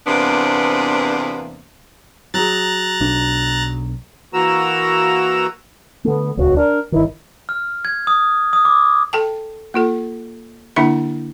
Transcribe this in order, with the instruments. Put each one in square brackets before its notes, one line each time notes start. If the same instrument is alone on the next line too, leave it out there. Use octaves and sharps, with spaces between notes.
[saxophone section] E2 C3 A#3 B3 D4 C5
[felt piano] F#3 G#4 [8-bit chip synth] A#5 F#6 A6
[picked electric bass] B1 D4
[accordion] E3 A#3 F#4 A#5 E6
[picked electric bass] D3 A3 [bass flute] B3
[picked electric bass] D#1 C#2 [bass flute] F#4
[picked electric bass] D4 [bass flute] A#4
[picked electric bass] G1 D#3 [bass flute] E4
[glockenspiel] F6
G#6
D#6
D#6
D6
[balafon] A4 G5 A5
A#3 F4 A4
D3 A#3 D4 E4 E5 B5